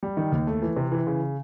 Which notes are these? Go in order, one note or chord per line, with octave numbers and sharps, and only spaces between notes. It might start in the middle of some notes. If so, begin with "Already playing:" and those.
G3
D#3
D#2
A3
E3
C3
E3
C#3